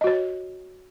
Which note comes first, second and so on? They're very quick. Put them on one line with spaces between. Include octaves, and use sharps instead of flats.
D#5 F#4 C#5